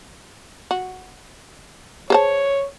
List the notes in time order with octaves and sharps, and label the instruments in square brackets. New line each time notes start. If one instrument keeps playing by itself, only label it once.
[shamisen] F#4
[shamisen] G#4 C5 A5 [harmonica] C#5